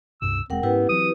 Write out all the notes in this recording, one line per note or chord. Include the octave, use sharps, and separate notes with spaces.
C#2 G2 C3 E6
E1 G#3 C4 A#4 F#5 G5
G#2 B3 C#4 E4 G4 B4
E3 F#3 C4 D#6